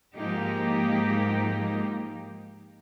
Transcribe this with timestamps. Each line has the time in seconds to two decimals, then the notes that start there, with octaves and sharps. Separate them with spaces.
0.16 G#2 F3 A#3 D#4 G4